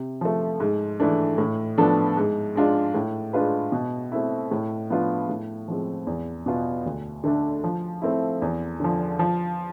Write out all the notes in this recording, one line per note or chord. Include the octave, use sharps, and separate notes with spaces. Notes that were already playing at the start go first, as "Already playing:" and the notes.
Already playing: C3
F3 A3
G#2
E3 A3 D4
A2
F3 B3 D4 A4
G#2
G#3 D4 F4
A2
G#3 D4 F4 B4
B2
A3 C4 E4
A2
F3 B3 D4 F4
A2
F3 G#3 C4
E2
B2 B3 F4
D2
D3 A3 D4
F3
A3 C4 E4
E2
D3 F3
F3